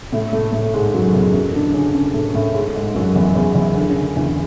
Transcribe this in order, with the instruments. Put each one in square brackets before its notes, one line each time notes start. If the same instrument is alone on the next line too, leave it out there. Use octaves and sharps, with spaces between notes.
[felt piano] A2 A3
A2 A3
A2 A3
G#2 G#3
F#2 F#3
E2 E3
F#2 F#3
D3 D4
C#3 C#4
C#3 C#4
A2 A3
A2 A3
G#2 G#3
G#2 G#3
F#2 F#3
E2 E3
E2 E3
E2 E3
D3
C#3
D3
E2 E3